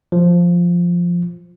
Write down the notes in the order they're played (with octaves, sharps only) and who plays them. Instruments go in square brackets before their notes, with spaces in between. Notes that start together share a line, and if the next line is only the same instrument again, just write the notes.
[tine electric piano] F3